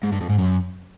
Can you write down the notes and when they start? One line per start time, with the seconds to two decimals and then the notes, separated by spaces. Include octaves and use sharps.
0.03 G#2
0.12 G2
0.21 F2
0.29 G#2
0.38 F#2